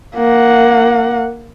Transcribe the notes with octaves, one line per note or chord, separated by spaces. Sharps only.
A#3 F#5